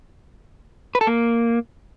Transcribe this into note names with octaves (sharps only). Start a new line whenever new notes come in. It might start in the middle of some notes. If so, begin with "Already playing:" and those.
B4
A4
A#3